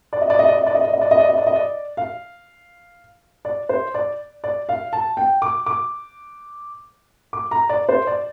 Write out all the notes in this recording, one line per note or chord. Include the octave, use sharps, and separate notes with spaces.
D5
D#5
D5
D#5
D5
D#5
D5
D#5
D5
D#5
D5
D#5
D5
D#5
D5
D#5
D5
F5
D5
C5
D5
D5
F5
A5
G5
D6
D6
D6
A#5
D5
C5
D5